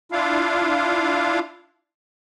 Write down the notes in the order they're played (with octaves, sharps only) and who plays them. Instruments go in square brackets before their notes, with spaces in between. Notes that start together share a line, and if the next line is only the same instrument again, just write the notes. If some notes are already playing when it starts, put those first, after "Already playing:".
[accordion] D4 E4 F4 F5